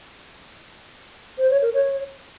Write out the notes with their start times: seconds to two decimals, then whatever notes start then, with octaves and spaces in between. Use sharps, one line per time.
1.38 C5
1.50 C#5
1.62 A#4
1.74 C#5